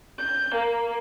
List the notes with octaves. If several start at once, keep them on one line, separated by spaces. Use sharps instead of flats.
G6
A#3